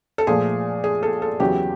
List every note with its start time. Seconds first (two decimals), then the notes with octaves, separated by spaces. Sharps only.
0.18 A4
0.27 A#2 F3 A3 G#4
0.84 G#4
1.03 A4
1.22 A4
1.40 E2 C#3 F#3 B3 G4